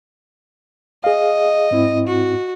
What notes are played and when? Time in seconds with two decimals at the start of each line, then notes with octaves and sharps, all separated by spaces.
1.04 G#4 D#5 F5
1.71 G#2 C4 E4
2.07 F#4